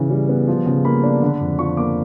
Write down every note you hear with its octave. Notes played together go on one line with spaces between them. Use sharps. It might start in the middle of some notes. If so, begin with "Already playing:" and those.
Already playing: C#3 E3
G3
B3
F3
C#3
A#3 B5
D4
D3
F2
F3 C#6
A#3 D6